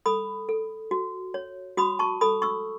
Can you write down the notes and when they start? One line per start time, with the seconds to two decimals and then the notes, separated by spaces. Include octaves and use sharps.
0.06 A4 B5 D#6
0.49 A4
0.91 F#4
1.34 C#5
1.77 F#4 B5 D#6
1.99 A5 C#6
2.21 A4 B5 D#6
2.42 C#6 E6